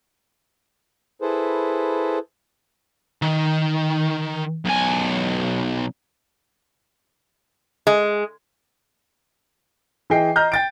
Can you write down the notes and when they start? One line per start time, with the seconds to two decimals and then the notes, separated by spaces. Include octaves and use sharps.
1.22 E4 G#4 A4 B4 C5
3.22 D#3
4.65 B1 G#5
7.87 G#3
10.10 E3 G#4 D#5 G5 C7
10.36 D#5 A#5 F6 G6
10.52 G5 A6 D7